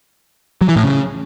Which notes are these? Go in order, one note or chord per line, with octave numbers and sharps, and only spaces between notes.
F#3
E3
A2
C#3